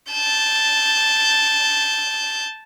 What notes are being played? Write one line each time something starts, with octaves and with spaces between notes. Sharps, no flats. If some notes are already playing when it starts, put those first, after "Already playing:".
A5 G6